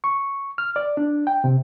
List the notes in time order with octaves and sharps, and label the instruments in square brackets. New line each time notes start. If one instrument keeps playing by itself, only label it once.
[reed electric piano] C#6
F6
D5
D4
G5
C3